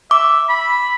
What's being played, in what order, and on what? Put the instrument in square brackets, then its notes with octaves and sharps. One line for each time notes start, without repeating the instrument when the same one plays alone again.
[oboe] E5 [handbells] D6
[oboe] B5